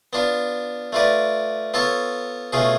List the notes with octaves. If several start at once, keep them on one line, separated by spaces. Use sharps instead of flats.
B3 D4 F4
A3 F4 B4 D5
B3 F4 A4 C#5
B2 A3 C#4 F4 G#4